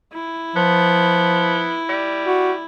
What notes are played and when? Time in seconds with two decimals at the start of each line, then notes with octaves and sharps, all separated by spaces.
0.13 E4
0.56 F3 B3
1.89 G3
2.27 F#4